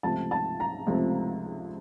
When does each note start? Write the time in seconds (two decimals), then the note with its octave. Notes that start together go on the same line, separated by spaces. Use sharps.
0.03 C#2 C3 F3 A3 C4 A5
0.31 A5
0.60 A#5
0.87 C#2 C3 F3 A3 C4